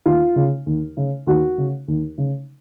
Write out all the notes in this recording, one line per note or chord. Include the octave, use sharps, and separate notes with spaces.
D#2 F4
C#3
D#2
C#3
D#2 F#4
C#3
D#2
C#3